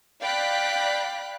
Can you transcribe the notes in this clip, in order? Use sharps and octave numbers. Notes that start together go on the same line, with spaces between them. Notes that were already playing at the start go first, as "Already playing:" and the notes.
D5 F5 G5 B5 F#6 B6